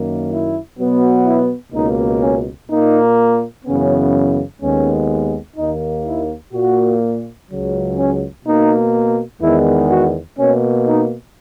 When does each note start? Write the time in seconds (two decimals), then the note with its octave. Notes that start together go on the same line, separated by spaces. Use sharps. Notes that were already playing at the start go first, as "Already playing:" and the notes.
Already playing: F#2 D#3 A#3
0.29 E4
0.76 B2 F#3 B3
1.24 E4
1.72 C#2 B2 A#3 D#4
2.20 C#4
2.68 A#2 A#3 D#4
3.65 F#2 C#3 E3 B3 C#4
4.60 D#2 D#3 G#3 B3 C#4
5.57 D#2 D#3 A#3 D#4
6.05 E4
6.53 A#2 A#3 F#4
7.49 C#2 C#3 F#3
7.98 C#4
8.45 B2 A#3 D#4
9.41 E2 D#3 G#3 B3 E4
9.89 F#4
10.37 B2 A#3 C#4
10.86 D#4